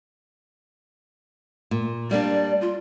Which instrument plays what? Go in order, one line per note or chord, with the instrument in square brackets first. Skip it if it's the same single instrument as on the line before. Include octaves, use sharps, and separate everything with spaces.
[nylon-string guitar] A#2
[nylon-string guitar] G3 A#3 D4 [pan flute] D5
[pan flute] F4